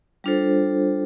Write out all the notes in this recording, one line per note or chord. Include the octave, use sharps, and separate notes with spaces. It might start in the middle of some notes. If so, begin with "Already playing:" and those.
G3 D4 F4 A4 C5